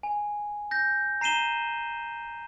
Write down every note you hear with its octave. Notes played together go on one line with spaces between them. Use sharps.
G#5
G6 A#6
A#5 C7 D#7 E7 G7